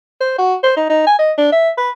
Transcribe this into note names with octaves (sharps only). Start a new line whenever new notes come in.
C5
F#4
C5
D#4
D#4
G#5
D#5
D4
E5
B4